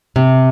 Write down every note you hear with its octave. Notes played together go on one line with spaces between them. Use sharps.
C3